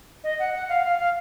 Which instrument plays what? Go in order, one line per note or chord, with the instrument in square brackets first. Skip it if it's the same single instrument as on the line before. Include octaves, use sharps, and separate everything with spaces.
[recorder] D#5
F#5
F#5
F5
F5
F5